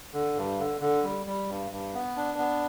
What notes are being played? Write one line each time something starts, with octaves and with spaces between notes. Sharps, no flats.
D3
G2
D3
D3
G3
G3
G2
G2
B3
D4
B3